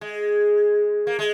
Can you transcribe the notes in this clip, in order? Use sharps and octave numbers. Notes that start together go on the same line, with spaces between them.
G#3
A#3
G#3